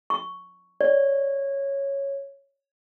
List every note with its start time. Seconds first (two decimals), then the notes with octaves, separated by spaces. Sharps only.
0.10 C#6
0.81 C#5 D5